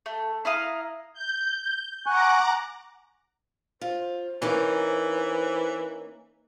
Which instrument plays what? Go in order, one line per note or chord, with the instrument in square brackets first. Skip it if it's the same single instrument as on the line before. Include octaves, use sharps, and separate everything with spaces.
[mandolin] A3
E4 F5 A#5 D#6
[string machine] G6
[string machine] F#5 A#5 D6 [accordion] G#5 C#6 F#6
[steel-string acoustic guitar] F4 [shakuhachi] C5
[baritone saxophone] E3 [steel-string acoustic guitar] A#3 C#4 D#4